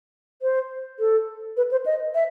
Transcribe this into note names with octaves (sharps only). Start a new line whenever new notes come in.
C5
A4
B4
C5
D#5
E5